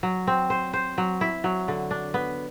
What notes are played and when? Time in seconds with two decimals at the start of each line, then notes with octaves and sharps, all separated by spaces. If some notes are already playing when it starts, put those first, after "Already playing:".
0.03 F#3
0.27 C4
0.50 C5
0.73 C5
0.98 F#3
1.21 E4
1.44 F#3
1.68 D3
1.91 D4
2.14 B3